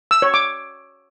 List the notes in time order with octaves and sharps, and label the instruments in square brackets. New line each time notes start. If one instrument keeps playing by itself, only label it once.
[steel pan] E6
C#5
D6